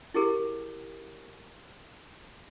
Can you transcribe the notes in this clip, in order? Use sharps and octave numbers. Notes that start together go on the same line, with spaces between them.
E4 G4 G#4 A#4